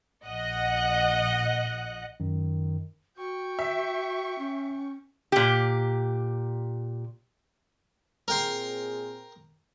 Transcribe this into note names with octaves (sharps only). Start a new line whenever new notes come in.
A#1 D#5 F#5 F#6
F#2 D#3
F#4 G5 C#6
E5
C#4
A#2 G4
A#2 C4 G#4 A#4 G5 C6